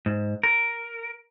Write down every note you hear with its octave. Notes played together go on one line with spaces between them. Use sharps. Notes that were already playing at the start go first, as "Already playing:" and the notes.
G#2
A#4